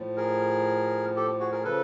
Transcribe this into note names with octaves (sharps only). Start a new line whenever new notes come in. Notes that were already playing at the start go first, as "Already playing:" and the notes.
Already playing: A2 F3
G#4 A#4
G4 A4
F#4 G#4
G#4 A#4
C#3 F3 A4 B4